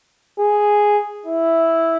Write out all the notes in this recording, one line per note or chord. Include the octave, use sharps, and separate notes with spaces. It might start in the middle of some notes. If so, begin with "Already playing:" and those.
G#4
E4